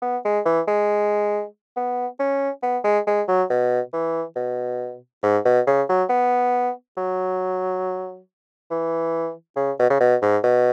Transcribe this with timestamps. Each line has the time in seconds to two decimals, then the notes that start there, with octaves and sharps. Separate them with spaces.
0.02 B3
0.25 G#3
0.45 E3
0.67 G#3
1.76 B3
2.19 C#4
2.63 B3
2.84 G#3
3.07 G#3
3.28 F#3
3.50 B2
3.93 E3
4.36 B2
5.23 G#2
5.45 B2
5.67 C#3
5.89 F#3
6.09 B3
6.97 F#3
8.71 E3
9.56 C#3
9.79 B2
9.90 C#3
10.00 B2
10.22 G#2
10.44 B2